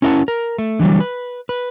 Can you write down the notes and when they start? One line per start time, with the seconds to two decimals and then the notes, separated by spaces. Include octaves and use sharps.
0.02 C#4 E4 A#4 D#5 F#5 A5
0.28 A#4
0.58 A3
0.79 D3 E3 F#3 G3
1.00 B4
1.49 B4